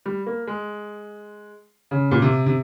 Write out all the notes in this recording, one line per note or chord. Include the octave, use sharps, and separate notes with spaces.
G3
A#3
G#3
C#3
A#2
C3
C3